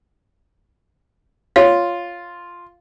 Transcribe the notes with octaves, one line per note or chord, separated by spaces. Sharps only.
F4 C#5